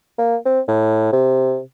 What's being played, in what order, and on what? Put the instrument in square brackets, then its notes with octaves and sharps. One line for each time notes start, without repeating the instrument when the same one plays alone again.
[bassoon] A#3
C4
A2
C3